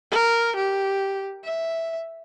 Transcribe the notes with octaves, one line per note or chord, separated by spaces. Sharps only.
A#4
G4
E5